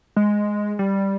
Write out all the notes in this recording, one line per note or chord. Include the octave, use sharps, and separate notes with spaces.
G#3
G3